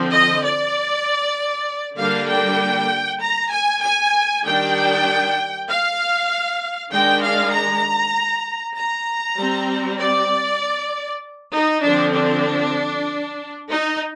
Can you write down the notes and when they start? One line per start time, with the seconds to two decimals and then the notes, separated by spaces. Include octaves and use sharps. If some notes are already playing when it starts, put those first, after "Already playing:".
Already playing: D3 F3 C4
0.12 D#5
0.43 D5
1.97 D3 G3 A#3 D4 F5
2.28 G5
3.21 A#5
3.50 G#5
3.82 G#5
4.43 D#3 G3 D4 G5
5.67 F5
6.91 D#3 G#3 D4 G5
7.21 F5
7.51 A#5
8.75 A#5
9.37 G3 C4
9.98 D5
11.53 D#4
11.83 D3 F3 C4 D4
12.14 D4
13.69 D#4